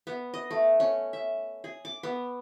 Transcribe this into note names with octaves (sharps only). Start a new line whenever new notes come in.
B3
D#5
A3
C#4
E5
G#4
D6
B3